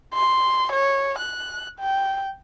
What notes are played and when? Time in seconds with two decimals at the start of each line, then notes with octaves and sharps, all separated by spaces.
0.14 C6
0.72 C#5
1.19 F#6
1.80 G5